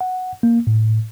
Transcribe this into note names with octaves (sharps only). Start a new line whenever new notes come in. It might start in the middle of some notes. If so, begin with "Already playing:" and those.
F#5
A#3
A2